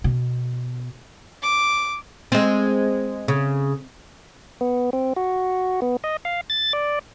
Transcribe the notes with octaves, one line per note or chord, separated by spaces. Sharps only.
B2
D6
G#3 C4
C#3
B3
C4
F#4
B3
D#5
F5
A6
D5